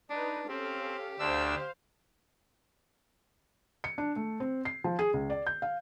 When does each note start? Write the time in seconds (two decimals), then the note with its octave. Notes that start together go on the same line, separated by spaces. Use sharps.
0.10 D4 D#4 B4
0.49 C4 C#4 G4 A4 F5
1.19 D2 D4 C5 F5 E6
3.84 C#7
3.98 D4
4.16 A3
4.40 C4
4.65 C7
4.84 F3
4.99 G#4
5.14 C#2
5.30 D5
5.47 G6
5.62 F5